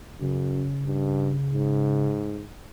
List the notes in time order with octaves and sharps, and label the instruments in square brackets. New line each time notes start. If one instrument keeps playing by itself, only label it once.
[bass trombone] F#2 [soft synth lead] C#3
[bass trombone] G2
G#2